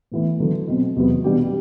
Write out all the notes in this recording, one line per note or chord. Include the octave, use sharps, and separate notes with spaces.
A2 E3 B3 E4
D3 F#3 B3
B2 F#3 C4
E2 C3 F#3 B3
B2 G3 D4 G4